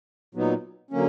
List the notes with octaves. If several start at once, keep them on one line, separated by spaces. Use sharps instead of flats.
A#2 F#3 B3 D#4
D3 F#3 A#3 C#4